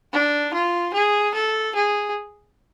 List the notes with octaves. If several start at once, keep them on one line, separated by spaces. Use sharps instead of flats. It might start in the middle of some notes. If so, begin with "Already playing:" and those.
D4
F4
G#4
A4
G#4